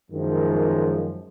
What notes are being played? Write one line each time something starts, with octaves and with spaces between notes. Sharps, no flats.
F#2 D#3 F3 G#3